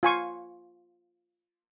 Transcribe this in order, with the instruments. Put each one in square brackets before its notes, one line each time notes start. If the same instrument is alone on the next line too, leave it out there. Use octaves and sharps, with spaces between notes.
[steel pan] F4 G#5 C#6